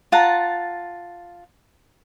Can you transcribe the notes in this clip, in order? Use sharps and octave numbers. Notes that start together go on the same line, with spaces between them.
F4 F#5 A5 A#5